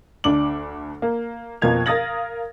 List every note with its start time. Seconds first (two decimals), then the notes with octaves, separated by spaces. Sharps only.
0.24 D2 D4 D6 F#7
1.02 A#3
1.62 F2 B2 F3 A#3 G#6 F7
1.86 A#4 F5 D#6 A6 A#6 F#7